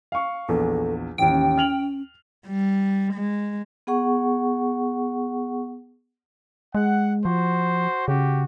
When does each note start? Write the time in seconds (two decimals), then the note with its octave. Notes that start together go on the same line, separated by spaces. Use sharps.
0.12 F5 C#6
0.49 A#1 E2 A4
1.18 A1 D#2 C#4 G5
1.58 F6 F7 F#7
2.46 G3
3.12 G#3
3.87 B3 G#4 F#5 C#6
6.75 G#3 F#5
7.25 F3 F#4 C5
8.08 C#3 F#4 G4